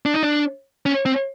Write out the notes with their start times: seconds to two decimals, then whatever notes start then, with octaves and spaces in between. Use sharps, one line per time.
0.06 D4
0.14 D#4
0.23 D4
0.86 C#4
1.06 C4